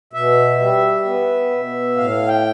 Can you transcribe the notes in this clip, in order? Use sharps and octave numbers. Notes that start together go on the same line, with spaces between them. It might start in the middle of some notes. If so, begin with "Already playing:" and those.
B2 E5
G3
B3
B2
A2 F5
G5